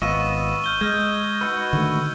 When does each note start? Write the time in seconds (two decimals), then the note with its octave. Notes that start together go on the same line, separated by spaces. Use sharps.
0.02 G#1 B3 F4 D#5 C#6 E6 D#7
0.64 F6 G6 G7
0.81 G#3 D#5 F6 G6 G#6
1.41 D#4 F#4 B4 E6
1.73 D3 D#3 A3